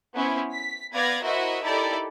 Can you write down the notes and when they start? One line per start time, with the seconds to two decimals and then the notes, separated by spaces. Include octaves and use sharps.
0.16 B3 C#4 E4 C5
0.52 B6
0.92 B3 B4 D5 F5 G#6 A#6
1.22 E4 F#4 A#4 C5 D#5 E5
1.63 D#4 E4 G4 A4 A#4 D5